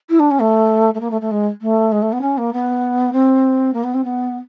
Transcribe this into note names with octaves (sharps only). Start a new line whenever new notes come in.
E4
D4
C#4
A3
A3
A#3
A3
A3
G#3
A3
G#3
A3
B3
C#4
A#3
B3
C4
A#3
B3
C4
B3